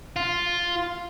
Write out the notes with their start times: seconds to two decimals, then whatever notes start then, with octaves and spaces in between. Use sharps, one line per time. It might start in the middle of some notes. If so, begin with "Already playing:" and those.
0.16 F4